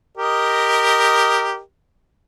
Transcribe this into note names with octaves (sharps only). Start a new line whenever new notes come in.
G4 A#4 D#5